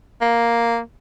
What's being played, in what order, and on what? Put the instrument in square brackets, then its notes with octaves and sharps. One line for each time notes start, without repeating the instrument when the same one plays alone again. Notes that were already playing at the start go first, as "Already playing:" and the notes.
[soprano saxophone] A#3